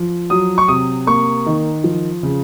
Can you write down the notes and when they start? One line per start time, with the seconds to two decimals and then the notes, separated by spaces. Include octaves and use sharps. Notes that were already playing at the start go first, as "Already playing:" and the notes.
Already playing: F3
0.30 F#3 D#6
0.58 C#6
0.68 C3 D#6
1.07 A#3 C#6
1.46 D#3
1.84 F3
2.23 C#3